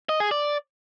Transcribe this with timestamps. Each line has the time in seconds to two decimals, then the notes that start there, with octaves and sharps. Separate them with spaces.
0.09 D#5
0.20 G#4
0.31 D5